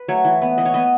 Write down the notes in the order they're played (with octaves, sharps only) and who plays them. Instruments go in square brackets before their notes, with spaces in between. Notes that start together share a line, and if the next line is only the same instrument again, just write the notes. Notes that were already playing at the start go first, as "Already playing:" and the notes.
Already playing: [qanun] B4
F#3 A3 C#5
E3
B3
E3 D#5
C#5
B3 D#5